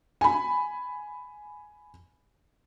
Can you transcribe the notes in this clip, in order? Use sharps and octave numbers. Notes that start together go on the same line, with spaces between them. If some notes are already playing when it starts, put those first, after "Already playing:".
G#5 B5